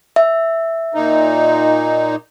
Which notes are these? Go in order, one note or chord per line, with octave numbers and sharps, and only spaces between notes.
E5
A#2 D#4